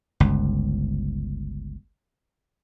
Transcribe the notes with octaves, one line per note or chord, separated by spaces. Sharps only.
G1 C#2